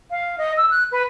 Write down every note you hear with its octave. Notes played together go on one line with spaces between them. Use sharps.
F5
D#5
E6
F#6
B4